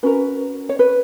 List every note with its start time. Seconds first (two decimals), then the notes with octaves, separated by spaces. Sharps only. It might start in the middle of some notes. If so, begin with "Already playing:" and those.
0.03 C#4 F#4 A#4 B4
0.69 C#5
0.79 B4